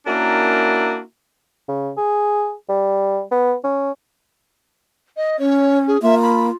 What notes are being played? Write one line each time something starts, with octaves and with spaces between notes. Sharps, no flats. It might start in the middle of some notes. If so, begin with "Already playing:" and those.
A#3 C#4 D4 E4 F#4 A#4
C#3
G#4
G3
B3
C#4
D#5
C#4 C#5
G#4
A#3 F4 E5
B5